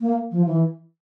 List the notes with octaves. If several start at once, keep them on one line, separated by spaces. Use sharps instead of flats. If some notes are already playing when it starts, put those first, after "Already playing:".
A#3
F3
E3